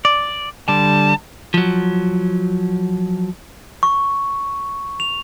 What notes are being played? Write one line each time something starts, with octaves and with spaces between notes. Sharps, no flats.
D5
D3 G3 A5
F3 F#3
C#6
F7